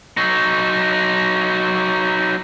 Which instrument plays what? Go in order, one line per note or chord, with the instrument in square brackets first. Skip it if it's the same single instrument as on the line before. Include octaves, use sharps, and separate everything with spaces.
[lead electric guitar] F#3 D#4